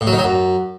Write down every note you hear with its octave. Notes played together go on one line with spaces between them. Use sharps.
A2
F#3
D#3
F#3
F#2